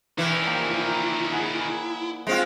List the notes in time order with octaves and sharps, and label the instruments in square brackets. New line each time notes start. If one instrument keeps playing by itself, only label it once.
[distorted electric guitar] D#3 C#4 [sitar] E3 [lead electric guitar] E4 [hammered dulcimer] D5 G5
[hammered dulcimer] F3 A#3 G5
A#4
G#4 F#5 G#5
[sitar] G#3 C4 F4